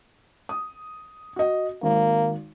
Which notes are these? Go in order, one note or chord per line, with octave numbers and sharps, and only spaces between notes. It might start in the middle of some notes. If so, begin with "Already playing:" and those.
D#6
F#4 D#5
G#1 A#3